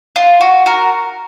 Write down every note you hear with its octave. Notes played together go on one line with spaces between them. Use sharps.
F4
F#4
F#4 A#4